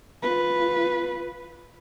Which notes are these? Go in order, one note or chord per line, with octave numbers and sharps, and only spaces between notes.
F4 B4